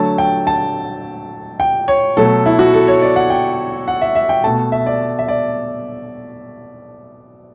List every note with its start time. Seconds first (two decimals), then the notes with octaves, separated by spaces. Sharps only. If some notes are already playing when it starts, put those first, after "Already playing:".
Already playing: D3 F#3 A3 A5
0.18 G5
0.47 A5
1.60 G5
1.88 C#5
2.17 B2 F#3 A3 A4
2.46 E4
2.59 F#4
2.74 A4
2.88 C#5
3.02 D5
3.16 F#5
3.30 G5
3.88 F#5
4.01 E5
4.15 E5
4.29 G5
4.44 B2 A3 A5
4.72 E5
4.86 D5
5.19 E5
5.28 D5